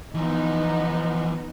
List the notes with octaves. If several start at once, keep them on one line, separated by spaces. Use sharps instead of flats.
E3 F3 B3 D#4